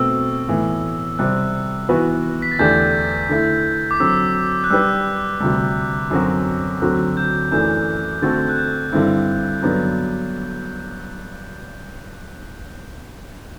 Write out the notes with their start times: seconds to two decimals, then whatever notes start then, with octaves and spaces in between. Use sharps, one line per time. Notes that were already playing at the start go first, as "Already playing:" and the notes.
Already playing: B2 A3 C4 E6
0.48 A2 E3 B3
1.19 C3 G3 C4 F#6
1.89 E3 B3 F#4 B4
2.42 B6
2.51 A6
2.59 E2 D3 A3 D4 G4 G6
3.29 D3 A3 E4
3.91 D6
3.99 D3 F#3 C4 E6
4.64 F#6
4.70 G3 D4 G4 B4 E6
5.40 D2 C3 G3 E6
6.11 F#2 D3 F#3 C4 F#4
6.81 D2 D3 F#3 C4 F#4 F#6
7.17 G6
7.51 F#2 E3 A3 D4 G6
8.22 D3 A3 C4 F#4 A4 A6
8.49 F#6
8.57 G6
8.93 G2 D3 G3 C4 E4
9.62 G2 D3 F#3 B3 D4